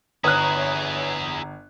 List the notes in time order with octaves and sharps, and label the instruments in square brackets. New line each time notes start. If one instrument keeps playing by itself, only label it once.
[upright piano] G1 F#6 [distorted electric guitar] E4 G#4 [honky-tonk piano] B4 C#5 D#6 [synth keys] A#5